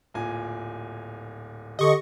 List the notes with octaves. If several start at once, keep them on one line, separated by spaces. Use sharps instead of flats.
D1 A#2 G#5
D3 G4 D#5 C#6